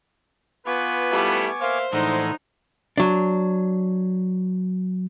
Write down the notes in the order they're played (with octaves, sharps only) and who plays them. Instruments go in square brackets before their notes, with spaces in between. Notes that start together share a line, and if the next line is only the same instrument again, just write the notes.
[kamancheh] B3 [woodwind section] F4 B4 [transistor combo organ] G#5 C#6 D6
[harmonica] G3 A3 E4
[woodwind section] A#3 E5 F5 [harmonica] C5
[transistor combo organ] A2 E3 [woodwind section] D3 F3 G#3 [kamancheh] D#4
[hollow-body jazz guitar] F#3 D4